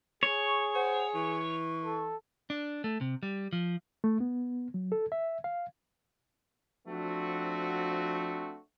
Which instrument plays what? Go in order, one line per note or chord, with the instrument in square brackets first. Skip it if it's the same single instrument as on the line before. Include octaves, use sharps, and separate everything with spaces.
[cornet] G#4 [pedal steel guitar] C#5 [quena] C#6
[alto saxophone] C5 [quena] F#5
[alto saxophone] E3 [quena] C#6
[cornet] A4
[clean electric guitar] D4
A3
C3
G3
F3
[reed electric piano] A3
B3
F#3
A4
E5
F5
[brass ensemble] F3 A3 C4 D4 F#4